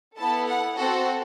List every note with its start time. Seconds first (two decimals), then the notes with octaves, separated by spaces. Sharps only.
0.16 B3 E4 A4 A5
0.47 F#5
0.76 C4 F#4 A4 F#5